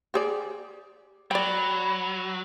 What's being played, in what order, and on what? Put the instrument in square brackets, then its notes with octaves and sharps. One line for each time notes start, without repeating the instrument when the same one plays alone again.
[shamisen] G4 G#4 D5
[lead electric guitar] F#3 [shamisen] D5 G5 [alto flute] B5